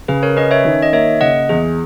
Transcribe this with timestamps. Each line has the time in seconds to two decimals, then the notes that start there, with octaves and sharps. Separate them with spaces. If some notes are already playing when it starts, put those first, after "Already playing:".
0.08 C#3 G#4 B4
0.23 A#4 C#5
0.36 C#4 B4 D#5
0.51 C#5 E5
0.65 D#3
0.82 D#5
0.92 A#3 C#5 E5
1.21 C#3 D#5 F#5
1.49 E2 G#4